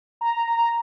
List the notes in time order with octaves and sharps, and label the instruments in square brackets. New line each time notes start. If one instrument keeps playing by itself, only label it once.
[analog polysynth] A#5